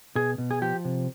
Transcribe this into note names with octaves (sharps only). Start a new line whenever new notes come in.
B2 G#4
B2
G#4
F3 G4
C3